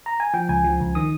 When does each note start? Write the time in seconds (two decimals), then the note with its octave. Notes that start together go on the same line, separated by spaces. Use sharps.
0.06 A#5
0.20 G#5
0.34 F3 G5
0.49 C#2 G#5
0.64 F3
0.80 C#2
0.95 D#3 D#6